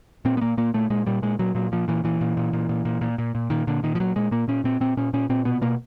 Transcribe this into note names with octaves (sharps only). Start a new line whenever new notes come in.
A#2 C4
B3
A#2 A#3
A#2 A#3
A#2 A3
A#2 G#3
A#2 G3
A#2 G#3
A#2 F#3
A#2 F#3
A#2 F3
A#2 E3
A#2 E3
A#2
A#2
A#2
A#2
A#2
A#2
A#2
A#2
A#2 D#3
A#2 D3
A#2 D#3
F3
A#2 F#3
A#2 G#3
A#2 A#3
A#2 C#4
A#2 C4
A#2 C4
A#2 C#4
A#2 C#4
A#2 C4
B2 B3
B2 A#3